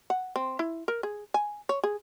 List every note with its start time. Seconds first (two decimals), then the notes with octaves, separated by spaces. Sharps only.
0.10 F#5
0.36 C4
0.59 E4
0.88 A#4
1.03 G#4
1.34 G#5
1.69 C#5
1.84 G#4